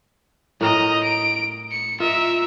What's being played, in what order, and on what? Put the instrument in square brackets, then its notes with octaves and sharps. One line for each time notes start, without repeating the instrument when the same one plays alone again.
[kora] A2 A#4 G5 [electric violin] D#5 A#5
[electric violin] D7
C#7
[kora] F4 D#5 [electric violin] A#4 E5